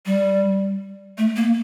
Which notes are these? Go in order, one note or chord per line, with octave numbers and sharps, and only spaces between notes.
G3
A3
A#3